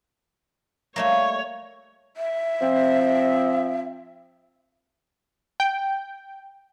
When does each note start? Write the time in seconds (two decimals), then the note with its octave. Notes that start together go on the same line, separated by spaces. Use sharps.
0.96 G3 A3 A#3 C#5
2.17 E5
2.62 F3 C4
5.60 G5